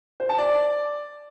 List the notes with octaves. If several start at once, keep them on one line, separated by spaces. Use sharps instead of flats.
C5
A5
D5